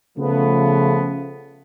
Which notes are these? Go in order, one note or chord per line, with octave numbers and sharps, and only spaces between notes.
C#3 F3 A3 B3